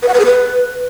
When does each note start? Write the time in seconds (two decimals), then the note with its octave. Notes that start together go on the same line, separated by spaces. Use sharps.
0.03 B4
0.08 F#5
0.14 B4
0.20 G#4
0.25 B4